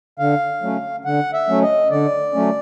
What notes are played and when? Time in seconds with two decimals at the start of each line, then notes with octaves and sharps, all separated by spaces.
0.19 D3 F5
0.62 F#3 A3 C#4
1.05 D3 F#5
1.33 E5
1.48 F#3 A3 C#4
1.63 D#5
1.91 D3 D5
2.34 F#3 A3 C#4